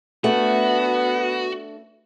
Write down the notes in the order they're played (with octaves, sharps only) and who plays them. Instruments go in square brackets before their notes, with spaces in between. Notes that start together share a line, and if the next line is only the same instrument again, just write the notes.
[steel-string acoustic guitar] A3 D4 [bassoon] B3 [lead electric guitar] F#4